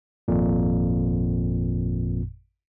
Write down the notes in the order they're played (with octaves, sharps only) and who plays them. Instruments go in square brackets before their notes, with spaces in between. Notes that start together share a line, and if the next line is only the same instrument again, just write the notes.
[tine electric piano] G#1 F2 A#2